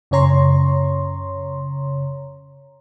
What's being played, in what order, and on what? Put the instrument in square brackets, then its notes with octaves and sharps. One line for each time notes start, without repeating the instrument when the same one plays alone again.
[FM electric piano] F#2 C#3 C#5 A#5 C6